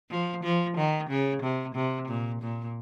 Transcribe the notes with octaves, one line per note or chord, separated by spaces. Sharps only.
F3
F3
D#3
C#3
C3
C3
A#2
A#2